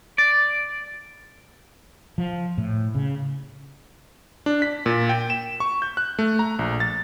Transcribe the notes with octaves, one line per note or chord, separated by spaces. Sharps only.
D5
F3
A2
C#3
D4
B6
A#2
G5
E7
C#6
G6
F#6
A3
A#5
A#1
A6